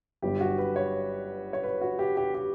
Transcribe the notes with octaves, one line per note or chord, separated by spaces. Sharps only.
G1 G2 F#3 G4
F#4
B4
C#5
C#5
B4
F#4
G4
G4
G4